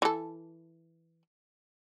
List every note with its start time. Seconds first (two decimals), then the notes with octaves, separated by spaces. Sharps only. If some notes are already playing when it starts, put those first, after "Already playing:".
0.02 E3 A4